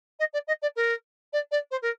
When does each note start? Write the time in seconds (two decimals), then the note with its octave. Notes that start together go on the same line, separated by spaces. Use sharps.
0.19 D#5
0.33 D5
0.47 D#5
0.62 D5
0.76 A#4
1.33 D5
1.51 D5
1.71 C5
1.82 A#4